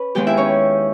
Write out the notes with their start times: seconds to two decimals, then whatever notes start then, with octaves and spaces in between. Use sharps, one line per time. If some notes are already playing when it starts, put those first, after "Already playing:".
Already playing: C#4 B4 B5
0.15 D#2 D#3 G#3 B3 G4 G5
0.27 E4 E5
0.37 C#4 C#5